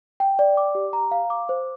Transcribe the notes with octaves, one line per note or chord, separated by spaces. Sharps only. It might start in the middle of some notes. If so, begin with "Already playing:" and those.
G5
D5
D6
G4
A#5
F5
D6
C5